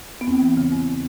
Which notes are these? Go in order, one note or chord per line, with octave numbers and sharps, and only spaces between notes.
B3
E2 C4
E3
C#3
E2